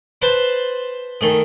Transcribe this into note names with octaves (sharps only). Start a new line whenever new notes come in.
B4 C5 A5 C6
D#3 A3 G#4